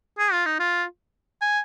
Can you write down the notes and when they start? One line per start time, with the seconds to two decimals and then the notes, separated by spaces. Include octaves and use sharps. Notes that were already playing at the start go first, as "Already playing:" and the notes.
0.19 G#4
0.32 F4
0.46 D#4
0.60 F4
1.41 G#5